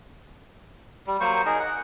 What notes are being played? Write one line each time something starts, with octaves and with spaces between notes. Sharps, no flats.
G3
F#3 A#3 C5 C#6
D#4 G#4 A#4
F#5